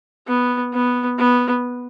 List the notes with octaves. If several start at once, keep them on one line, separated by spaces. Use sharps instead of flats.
B3
B3
B3